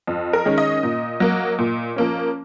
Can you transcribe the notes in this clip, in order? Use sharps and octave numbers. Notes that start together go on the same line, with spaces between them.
F2
A#4
D#3 G#3 C#4
D#5
A#2
F#3 A#3
A#2
F3 A#3 C#4